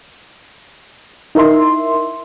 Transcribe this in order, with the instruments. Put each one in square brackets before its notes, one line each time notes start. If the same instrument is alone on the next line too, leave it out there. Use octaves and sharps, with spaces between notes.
[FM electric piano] D#4 E4 A#4 E5 C6